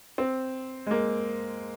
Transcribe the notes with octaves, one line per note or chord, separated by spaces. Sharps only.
C4
G#3
A#3